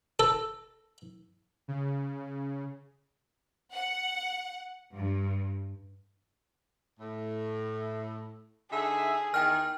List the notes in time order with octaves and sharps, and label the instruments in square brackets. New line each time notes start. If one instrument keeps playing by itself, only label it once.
[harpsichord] A4
[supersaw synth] C#3
[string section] F#5
G2
[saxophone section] A2
[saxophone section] D3 D#4 E5 [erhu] G#4
[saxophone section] E2 D#3 [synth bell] G5 F6